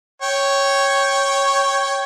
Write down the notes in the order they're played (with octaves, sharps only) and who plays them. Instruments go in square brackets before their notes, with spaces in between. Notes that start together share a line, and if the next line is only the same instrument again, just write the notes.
[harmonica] C#5 G5